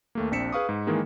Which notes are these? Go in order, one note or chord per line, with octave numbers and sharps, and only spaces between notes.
D#2 A3 A#3
A#1 C4 D4 B6 C#7 E7
G#4 B4 F5 C#6 D#6
G#2
D#3 E3 G#3 A#3 G#4